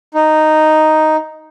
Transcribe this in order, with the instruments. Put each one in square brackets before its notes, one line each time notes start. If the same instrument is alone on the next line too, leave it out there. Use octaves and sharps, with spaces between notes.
[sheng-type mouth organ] D#4